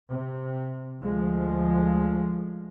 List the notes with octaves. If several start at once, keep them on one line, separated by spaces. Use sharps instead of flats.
C3
D2 F3 G#3